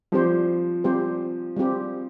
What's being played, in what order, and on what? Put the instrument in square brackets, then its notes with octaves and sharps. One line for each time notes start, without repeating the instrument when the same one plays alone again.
[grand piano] F3 [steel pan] G3 C4 G4 C5
[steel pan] G3 C4 G4 C5
G3 C4 G4